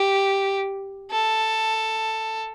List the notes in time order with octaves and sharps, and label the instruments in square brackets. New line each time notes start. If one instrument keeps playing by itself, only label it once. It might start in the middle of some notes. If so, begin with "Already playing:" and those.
Already playing: [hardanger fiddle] G4
A4